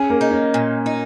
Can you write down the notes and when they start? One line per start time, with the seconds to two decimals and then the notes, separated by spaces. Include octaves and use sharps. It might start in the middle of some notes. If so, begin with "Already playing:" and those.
Already playing: C#4 G#4
0.10 A#3
0.21 D#4
0.31 C#4
0.54 A#2
0.86 D#4